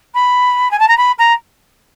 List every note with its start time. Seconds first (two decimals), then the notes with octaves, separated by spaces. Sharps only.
0.14 B5
0.71 G#5
0.79 A5
0.88 A#5
0.97 B5
1.19 A#5